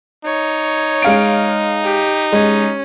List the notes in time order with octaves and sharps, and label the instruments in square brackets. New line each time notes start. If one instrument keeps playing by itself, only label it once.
[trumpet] D#4 [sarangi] C#5
[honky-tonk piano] G#3 F5 D7
[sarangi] G4
[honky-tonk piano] G#3 [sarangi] C#4